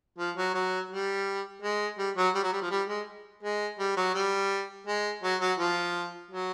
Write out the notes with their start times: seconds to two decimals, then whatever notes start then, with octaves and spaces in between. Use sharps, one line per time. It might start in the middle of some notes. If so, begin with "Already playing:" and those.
0.19 F3
0.37 F#3
0.54 F#3
0.91 G3
1.62 G#3
1.98 G3
2.17 F#3
2.35 G3
2.44 F#3
2.53 G3
2.62 F3
2.71 G3
2.89 G#3
3.43 G#3
3.79 G3
3.97 F#3
4.15 G3
4.87 G#3
5.23 F#3
5.41 F#3
5.59 F3
6.31 F#3